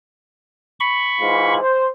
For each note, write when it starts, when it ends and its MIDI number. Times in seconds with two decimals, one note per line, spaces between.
0.80 1.54 83
0.80 1.54 85
1.19 1.59 44
1.19 1.59 52
1.19 1.59 65
1.61 1.87 72